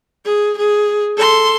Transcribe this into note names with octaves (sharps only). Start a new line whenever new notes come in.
G#4
G#4
A4 C6